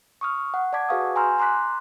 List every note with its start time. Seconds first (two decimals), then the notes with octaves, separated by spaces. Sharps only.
0.21 C#6 D#6 F6
0.54 F#5
0.73 D5 F#5 A5 D6 G#6 B6
0.89 F#4 G#4 B4 F5 C#6 D#6
1.16 G#5 A#5 C6 E6 F6 G6
1.39 A#5 C6 D6 F#6 B6